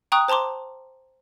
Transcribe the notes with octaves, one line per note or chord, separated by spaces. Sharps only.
G5 A#5 C#6 D#6 F#6
C5 A5 A#5 C6 D6